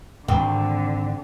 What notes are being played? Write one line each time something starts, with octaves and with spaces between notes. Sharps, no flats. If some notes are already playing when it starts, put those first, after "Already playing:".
D1 G#1 D3 C4